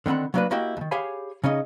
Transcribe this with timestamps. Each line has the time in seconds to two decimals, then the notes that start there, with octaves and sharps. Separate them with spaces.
0.06 D3 D#3 C4 F#5 B5
0.34 F#3 G3 A#3 D4 F#4 B4
0.51 A#3 E4 F#4 G4 D#5 G5
0.77 D#2 D#3
0.91 G4 G#4 C#5 F5 G#5 B5
1.44 C#3 C#4 D#4 D#5